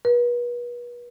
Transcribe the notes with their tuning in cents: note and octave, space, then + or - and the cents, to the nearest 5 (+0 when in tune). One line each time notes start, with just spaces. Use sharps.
B4 -35